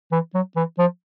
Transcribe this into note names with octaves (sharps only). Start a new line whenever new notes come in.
E3
F#3
E3
F3